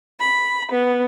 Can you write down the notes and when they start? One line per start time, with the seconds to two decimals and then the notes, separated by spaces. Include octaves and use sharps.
0.19 B5
0.71 B3